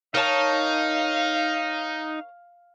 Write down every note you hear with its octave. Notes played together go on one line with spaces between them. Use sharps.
D#4 A#4 C#5 F5 A5